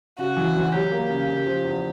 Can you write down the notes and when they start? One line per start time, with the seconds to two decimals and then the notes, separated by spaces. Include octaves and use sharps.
0.18 C#3 F#4
0.37 E3
0.55 D2
0.73 F#3 G4
0.91 A#3
1.10 C#3
1.28 C#3
1.46 F3
1.65 E2